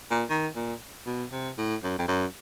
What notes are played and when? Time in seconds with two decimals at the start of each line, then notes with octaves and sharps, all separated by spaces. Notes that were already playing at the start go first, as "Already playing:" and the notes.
0.11 A#2
0.30 D#3
0.56 A#2
1.06 B2
1.32 C3
1.58 A2
1.84 F#2
1.99 F2
2.08 F#2